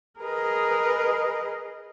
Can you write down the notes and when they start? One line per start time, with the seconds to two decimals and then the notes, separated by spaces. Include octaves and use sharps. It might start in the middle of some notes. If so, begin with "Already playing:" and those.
0.21 G#4 A#4 B4 D#5